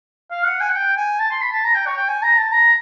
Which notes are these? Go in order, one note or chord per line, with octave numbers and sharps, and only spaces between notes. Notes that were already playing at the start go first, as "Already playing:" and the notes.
F5
F#5
G#5
F#5
G5
G#5
A5
C6
B5
A5
A#5
G5
C#5
G5
G#5
A#5
A5
A#5